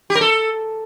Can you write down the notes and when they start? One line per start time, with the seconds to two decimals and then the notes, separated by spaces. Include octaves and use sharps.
0.10 G4
0.15 A#4
0.21 A4